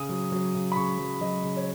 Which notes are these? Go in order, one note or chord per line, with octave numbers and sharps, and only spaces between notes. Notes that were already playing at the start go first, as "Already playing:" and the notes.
Already playing: C#3 D#6
F#3
F#3
C#3
B5
C#3 C#6
F#3
F#3 D#5
C#3
C#5